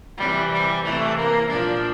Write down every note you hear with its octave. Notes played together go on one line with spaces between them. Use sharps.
C3 E3 G3
G3
C3 E3 A3
A#3
A#2 F3 D4